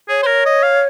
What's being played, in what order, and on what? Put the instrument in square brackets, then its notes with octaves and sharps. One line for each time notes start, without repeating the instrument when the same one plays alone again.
[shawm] G#4 [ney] C#5
[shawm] C5
A#4
D#5
F5